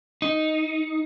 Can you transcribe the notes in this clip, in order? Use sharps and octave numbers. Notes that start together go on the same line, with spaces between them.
D#4